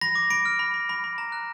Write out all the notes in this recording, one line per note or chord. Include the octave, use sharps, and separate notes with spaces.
B5 A#6
D6
B5 D7
F6
B5
B5
B5
B5
A#5
F#6